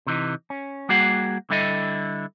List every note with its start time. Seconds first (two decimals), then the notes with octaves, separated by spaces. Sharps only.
0.07 C3 E3 D#4
0.50 C#4
0.89 G3 A#3 F#4 G#4 F#5
1.50 D3 G3 E4 A4 D#5